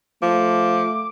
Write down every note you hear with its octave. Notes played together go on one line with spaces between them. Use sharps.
F3 A3 D6